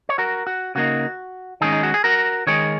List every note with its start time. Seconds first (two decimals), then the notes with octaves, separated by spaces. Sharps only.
0.09 C#5
0.18 F#4 A#4
0.47 F#4
0.75 C#3 A#3 D#4 F#4
1.61 D#3 G#3 C#4 D#4 G#4
1.72 D#4
1.83 F#4
1.94 G#4
2.04 F#4 A#4
2.47 D#3 G#3 D#4 G#4 C#5